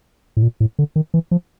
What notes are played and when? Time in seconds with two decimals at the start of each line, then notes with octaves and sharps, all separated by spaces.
0.37 A2
0.42 A#2
0.60 A2
0.79 D3
0.96 D#3
1.14 E3
1.31 F3